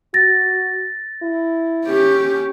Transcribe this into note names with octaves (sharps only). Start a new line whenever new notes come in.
F#4 A6 A#6
E4
C#4 G4